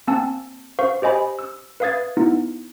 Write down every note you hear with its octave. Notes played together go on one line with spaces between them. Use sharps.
A#3 C4 G#5 A5 E6
C5 F5 C#6
G4 C5 D#5 G#5 B5
E6
B4 E5 F5 D#6 G#6 A6
B3 D#4 E4